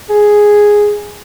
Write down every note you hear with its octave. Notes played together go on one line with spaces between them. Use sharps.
G#4